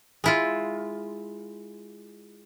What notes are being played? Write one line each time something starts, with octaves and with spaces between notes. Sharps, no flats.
G#3 E4 F4